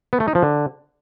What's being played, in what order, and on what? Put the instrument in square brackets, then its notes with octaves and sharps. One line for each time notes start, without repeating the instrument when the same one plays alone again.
[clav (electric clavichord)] B3
A3
D#4
F3
D3